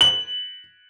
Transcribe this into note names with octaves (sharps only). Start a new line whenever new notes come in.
F#7